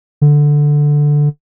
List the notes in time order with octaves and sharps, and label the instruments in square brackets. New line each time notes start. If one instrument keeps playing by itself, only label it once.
[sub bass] D3